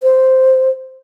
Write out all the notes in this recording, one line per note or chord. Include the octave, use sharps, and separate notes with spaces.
C5